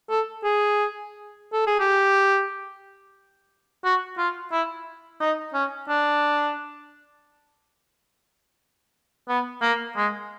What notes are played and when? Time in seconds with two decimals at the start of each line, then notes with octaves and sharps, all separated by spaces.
0.10 A4
0.44 G#4
1.53 A4
1.67 G#4
1.80 G4
3.85 F#4
4.18 F4
4.52 E4
5.21 D#4
5.54 C#4
5.89 D4
9.29 B3
9.62 A#3
9.96 G#3